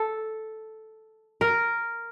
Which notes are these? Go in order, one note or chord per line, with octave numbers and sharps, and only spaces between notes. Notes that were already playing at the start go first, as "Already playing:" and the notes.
Already playing: A4
A#4